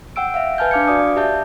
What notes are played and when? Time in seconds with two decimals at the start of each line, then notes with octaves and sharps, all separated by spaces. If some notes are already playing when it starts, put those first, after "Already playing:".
0.16 F#5 G5 E6 D7
0.34 E5 F5
0.58 B4 G#5 A5 F6 G6
0.71 D4 F5 D6 F6 G#6 C#7
0.88 F#4 D5 D6 D#6
1.16 G4 E5 A5 G6